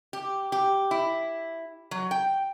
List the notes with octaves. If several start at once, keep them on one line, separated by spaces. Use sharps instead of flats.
G4
G4
E4
F#3
G5